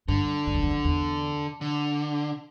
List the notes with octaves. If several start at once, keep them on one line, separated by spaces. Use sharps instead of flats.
G2 D3
G2
F2
E2
F2
E2
D3